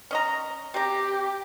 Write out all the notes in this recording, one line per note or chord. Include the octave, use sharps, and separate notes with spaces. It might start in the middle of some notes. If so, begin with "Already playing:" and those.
C#4 D#5 A#5
C4 G4 A#5